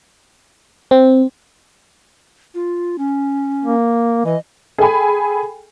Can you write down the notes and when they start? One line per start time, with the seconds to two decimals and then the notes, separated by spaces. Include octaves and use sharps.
0.91 C4
2.55 F4
2.99 C#4
3.64 A#3
4.25 E3 D#5
4.78 G#4 A4 G5 G#5 B5